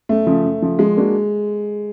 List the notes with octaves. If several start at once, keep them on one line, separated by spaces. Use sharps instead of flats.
F#2 A3
C#3 F3
F#2
C#3 F3
F3 G#3
A#3 D4 F#4